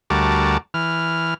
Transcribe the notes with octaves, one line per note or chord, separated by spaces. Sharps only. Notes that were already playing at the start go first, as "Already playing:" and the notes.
D2 G3 F#4 A#4 D5 A5
E3 F6